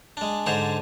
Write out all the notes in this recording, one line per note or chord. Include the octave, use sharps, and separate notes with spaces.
G#3 D4
G#2 D3 C5 C#5 C#6